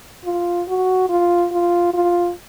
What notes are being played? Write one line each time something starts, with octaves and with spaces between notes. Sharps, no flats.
F4
F#4
F4
F4
F4